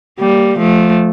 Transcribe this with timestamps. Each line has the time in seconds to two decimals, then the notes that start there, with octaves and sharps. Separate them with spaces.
0.19 G3 A#3
0.58 F3 A3